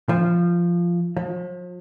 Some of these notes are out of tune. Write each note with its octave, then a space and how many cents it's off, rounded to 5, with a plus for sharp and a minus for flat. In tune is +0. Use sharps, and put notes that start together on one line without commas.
F3 -10
F3 +40